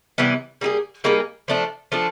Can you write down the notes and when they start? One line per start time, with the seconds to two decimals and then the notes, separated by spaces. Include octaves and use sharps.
0.18 C3 E3 G3 B3
0.61 G3 A#3 D#4 G#4
1.04 G3 A#3 D#4 G#4
1.48 F3 A3 D4
1.92 F3 A3 D4